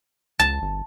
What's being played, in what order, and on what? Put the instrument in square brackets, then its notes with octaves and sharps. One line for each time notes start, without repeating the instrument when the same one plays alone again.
[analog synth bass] C#2 [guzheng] A5
[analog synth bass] G1